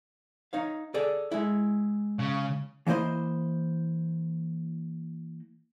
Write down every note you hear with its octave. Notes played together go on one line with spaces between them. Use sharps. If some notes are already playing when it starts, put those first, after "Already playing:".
D#4 C#5 F5
G#4 A4 D5
G#3 E4
C#3
E3 A#3 E4 C5 D#5